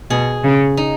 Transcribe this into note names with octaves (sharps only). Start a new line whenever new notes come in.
B2 G#4
C#3
D#4